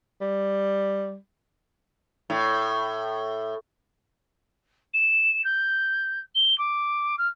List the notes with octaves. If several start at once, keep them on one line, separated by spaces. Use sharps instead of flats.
G3
A2
E7
G6
G7
D6
F6